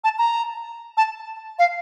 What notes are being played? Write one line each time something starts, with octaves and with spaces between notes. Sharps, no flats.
A5
A#5
A5
F5